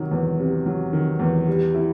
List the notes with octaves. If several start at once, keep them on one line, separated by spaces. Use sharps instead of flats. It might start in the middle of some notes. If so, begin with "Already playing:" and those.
Already playing: C3 D#3 F#3
E2
C3
F#3
D#3
E2
G3
E4